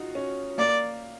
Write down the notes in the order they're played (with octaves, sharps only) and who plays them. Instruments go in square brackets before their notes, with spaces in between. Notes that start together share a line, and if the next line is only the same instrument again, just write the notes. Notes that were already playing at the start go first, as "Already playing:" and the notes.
Already playing: [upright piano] D#4 F4 F#4
C#4
[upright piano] A#3 [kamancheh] D5